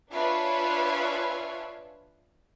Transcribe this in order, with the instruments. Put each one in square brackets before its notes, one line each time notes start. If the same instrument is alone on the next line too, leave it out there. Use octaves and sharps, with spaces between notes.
[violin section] D4 F4 B4 C#5 E5 G#5